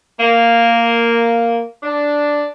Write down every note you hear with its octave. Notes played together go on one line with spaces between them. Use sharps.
A#3
D4